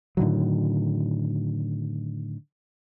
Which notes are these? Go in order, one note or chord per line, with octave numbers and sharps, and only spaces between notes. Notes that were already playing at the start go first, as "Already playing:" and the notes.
A2 D3 D#3 F#3